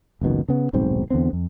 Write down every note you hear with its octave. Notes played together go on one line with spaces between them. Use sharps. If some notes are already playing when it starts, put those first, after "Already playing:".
F#1 C#2 B2 D#3
C#3 B3
D#1 B1 G#2 C4
E2 D3 B3 C4
F2